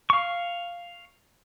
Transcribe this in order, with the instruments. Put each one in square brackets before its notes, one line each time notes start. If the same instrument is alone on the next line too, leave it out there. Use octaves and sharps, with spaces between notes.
[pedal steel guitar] F5 C#6